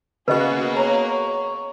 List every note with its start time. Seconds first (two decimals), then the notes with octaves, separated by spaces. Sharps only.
0.28 C#3 A#3 B3 F#4 G#4 B4 D#5
0.77 C#5 A#5